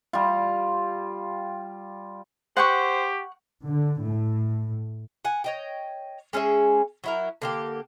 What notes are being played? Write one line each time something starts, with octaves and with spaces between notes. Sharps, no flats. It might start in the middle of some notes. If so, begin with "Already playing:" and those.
G3 F4
G4 C5 F#5 G5 C#6
D3
A2
F#5 G#5
C#5 D#5 G5
G#3 C#4 G#4 E5
F#3 E4 A#4
D3 A#3 G4